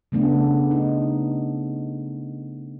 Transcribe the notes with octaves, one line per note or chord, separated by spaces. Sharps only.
C#3 A3 B3 D4
D#4